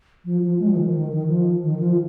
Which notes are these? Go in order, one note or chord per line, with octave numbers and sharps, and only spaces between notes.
F3
F3
G#3
F3
D#3
F3
D#3
D#3
F3
D#3
F3